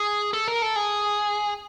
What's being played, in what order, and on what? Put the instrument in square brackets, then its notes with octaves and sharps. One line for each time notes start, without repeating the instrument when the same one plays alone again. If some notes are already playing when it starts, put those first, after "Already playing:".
Already playing: [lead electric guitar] G#4
A4
A#4
A4
G#4